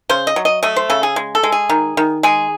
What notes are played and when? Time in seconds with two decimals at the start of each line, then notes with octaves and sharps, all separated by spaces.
0.09 C#3 C5
0.27 D#5
0.36 F#3
0.45 D#5
0.63 A3 D#5
0.76 C5
0.90 C#3 A4
1.03 G#4
1.16 G#3
1.35 A4
1.43 G#3
1.52 G#4
1.69 D#3
1.97 D#3
2.23 G#3 G#4